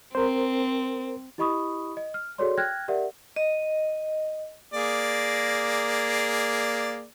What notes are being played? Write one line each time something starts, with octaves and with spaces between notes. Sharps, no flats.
C4 A#4 C5
E4 G4 D#5 B5 C#6 D#6
D#5
F6
F#4 G#4 A4 C#5 D5 C6
G5 F6 F#6 G#6 A#6
G4 A#4 D5 E5 F#5
D#5
A#3 G#4 D5